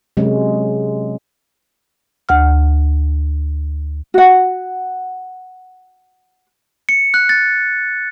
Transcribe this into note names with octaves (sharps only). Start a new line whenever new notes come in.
C3 F#3 G#3 C#4
D2 F#5 F6
F#4 F#5
C#7
F#6
A6